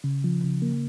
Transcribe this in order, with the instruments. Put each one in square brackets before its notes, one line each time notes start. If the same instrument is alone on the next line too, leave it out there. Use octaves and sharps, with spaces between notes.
[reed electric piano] C#3
F3
C#3
A#3